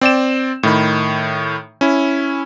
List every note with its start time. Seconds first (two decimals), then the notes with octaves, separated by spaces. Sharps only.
0.01 C4 D5 G5 E7
0.63 A2 D#3 B5
1.81 C#4 E4